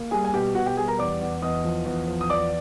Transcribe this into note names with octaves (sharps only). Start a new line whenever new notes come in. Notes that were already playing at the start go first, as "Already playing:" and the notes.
Already playing: A#3
G3 G#4 G#5
G#5
B2 G4 G5
B2 F#4 F#5
G4 G5
G3 G#4 G#5
A#4 A#5
E2 D5 D6
E2
E2 D#5 D#6
F3
E2
F3
D#6
E2 D5 D6